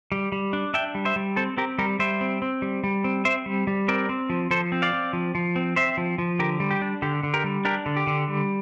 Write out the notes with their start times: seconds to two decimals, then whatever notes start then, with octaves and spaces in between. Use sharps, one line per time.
0.12 G3
0.32 G3
0.53 D4
0.74 D4 E5 G5
0.95 G3
1.05 C5 E5
1.16 G3
1.36 C4 A4 C5
1.57 C4 G4 A#4
1.78 G3 G4 A#4
1.99 G3 C5 E5
2.21 C4
2.42 C4
2.62 G3
2.84 G3
3.04 C4
3.25 C4 C5 E5
3.46 G3
3.67 G3
3.88 C4 A#4 D5
4.09 C4
4.30 F3
4.51 F3 A4 C5
4.72 C4
4.82 D5 F5
4.93 C4
5.13 F3
5.35 F3
5.56 C4
5.76 C4 C5 E5
5.97 F3
6.18 F3
6.39 D3 G4 A#4
6.60 G3
6.71 G4
6.82 D4
7.02 D3 G4
7.23 D3
7.34 G4 A#4
7.44 G3
7.65 D4 G4 A#4
7.86 D3
7.96 G4
8.07 D3
8.28 G3